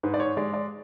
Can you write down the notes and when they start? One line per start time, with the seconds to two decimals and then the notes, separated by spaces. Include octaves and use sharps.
0.03 G#2 B4
0.14 D5
0.20 C#5
0.37 G#3 D5
0.54 D5